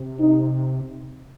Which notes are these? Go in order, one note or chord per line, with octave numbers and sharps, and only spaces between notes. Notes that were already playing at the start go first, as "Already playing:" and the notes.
Already playing: C3
D#4